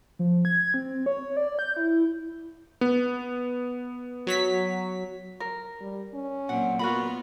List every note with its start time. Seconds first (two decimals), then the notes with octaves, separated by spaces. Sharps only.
0.19 F3
0.45 G#6
0.74 C4
1.06 C#5
1.37 D5
1.59 G6
1.76 E4
2.81 B3
4.27 F#3 C#5 B6
5.40 A#4
5.81 G3
6.14 C#4
6.49 A#2 F#3 C4 F#5
6.79 B3 F4 F#4 A#4 B5